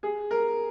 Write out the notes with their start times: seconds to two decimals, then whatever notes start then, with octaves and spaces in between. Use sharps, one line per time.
0.03 G#4
0.31 A#4